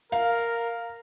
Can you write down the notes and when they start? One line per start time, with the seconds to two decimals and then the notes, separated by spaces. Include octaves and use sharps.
0.12 A#4 F5